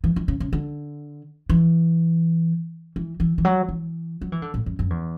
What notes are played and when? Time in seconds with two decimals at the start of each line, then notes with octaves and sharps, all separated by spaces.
0.04 E3
0.16 E3
0.28 C#3
0.40 C#3
0.53 D3
1.49 E3
2.96 E3
3.20 E3
3.38 E3
3.45 F#3
3.69 E3
4.22 F#3
4.32 E3
4.42 D3
4.54 A2
4.66 F#2
4.79 F#2
4.90 E2